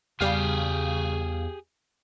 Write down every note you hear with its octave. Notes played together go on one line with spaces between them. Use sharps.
E2 C#3 G3 G4 G#4 F5